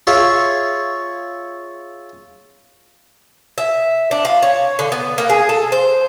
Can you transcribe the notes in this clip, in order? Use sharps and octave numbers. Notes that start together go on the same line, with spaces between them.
F4 G#4 C#5 E5
E5
D4
F4
C#5
D3
B3
A#3
G#4
A4
C5